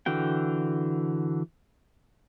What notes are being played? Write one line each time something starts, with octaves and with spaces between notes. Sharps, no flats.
D3 E3 F#4 G5